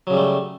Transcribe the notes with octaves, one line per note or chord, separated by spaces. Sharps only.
C#3 F#3 G3 A3